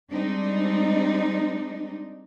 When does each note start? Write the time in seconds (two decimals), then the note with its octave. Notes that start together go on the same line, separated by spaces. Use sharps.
0.10 G3 G#3 C4 D4 D#4